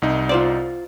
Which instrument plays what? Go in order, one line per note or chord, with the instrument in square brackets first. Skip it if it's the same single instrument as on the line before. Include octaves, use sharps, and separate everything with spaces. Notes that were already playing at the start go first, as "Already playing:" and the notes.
[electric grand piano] C2 D#4
[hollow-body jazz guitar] F4 C5 D5